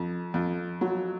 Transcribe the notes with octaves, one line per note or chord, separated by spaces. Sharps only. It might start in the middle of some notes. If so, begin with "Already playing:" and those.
Already playing: F2
F2
F#3